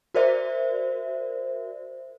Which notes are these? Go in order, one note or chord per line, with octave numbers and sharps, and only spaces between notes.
F#4 A#4 C5 D5 E5